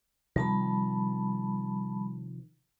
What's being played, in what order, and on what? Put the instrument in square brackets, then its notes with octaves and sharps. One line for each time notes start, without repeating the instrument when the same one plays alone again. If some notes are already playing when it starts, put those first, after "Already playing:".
[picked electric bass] C3 D#3 F3 [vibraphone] G3 A5 B5